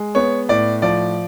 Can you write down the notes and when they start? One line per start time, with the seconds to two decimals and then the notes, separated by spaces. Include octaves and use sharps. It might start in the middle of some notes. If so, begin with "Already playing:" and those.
Already playing: G#3
0.15 B3 C#5
0.49 A2 D5
0.82 F3 D5